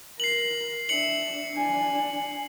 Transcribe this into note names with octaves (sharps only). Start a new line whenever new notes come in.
A#4 C7 F#7
D4 E5 C#7 F#7
D4 G#5